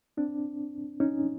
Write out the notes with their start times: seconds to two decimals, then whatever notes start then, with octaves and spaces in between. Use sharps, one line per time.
0.17 C4 D4
1.00 C#4 D#4